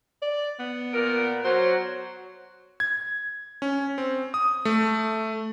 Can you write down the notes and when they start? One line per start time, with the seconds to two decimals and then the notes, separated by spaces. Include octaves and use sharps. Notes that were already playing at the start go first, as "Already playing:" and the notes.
0.22 D5
0.59 B3
0.94 A#2 A#4
1.45 F#3 C5
2.80 G#6
3.62 C#4
3.98 C4
4.34 D#6
4.65 A3